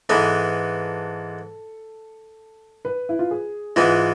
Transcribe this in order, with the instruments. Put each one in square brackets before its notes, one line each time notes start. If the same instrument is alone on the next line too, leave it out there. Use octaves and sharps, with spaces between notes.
[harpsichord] G#2 E3 B3 [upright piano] A4
[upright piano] B4
E4
F4
G#4
[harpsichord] G#2 E3 B3 [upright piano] F4